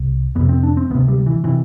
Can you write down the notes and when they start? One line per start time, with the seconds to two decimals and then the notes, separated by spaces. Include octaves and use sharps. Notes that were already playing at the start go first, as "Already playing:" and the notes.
Already playing: C2
0.35 F2 C3 B3
0.49 C4
0.63 D4
0.77 C4
0.90 D2 C3 B3
1.08 G3
1.26 E3
1.44 C3 E3